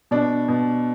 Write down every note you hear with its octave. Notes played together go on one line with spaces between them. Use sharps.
B2 D4
B2